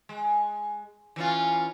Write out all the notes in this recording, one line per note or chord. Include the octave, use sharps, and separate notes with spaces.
G#3
E3 C#4 F4